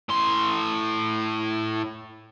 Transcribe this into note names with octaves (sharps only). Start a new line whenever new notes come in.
A2 C6